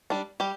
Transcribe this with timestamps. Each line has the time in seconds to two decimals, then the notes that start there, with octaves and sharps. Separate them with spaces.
0.10 G3 D4
0.40 G3 G4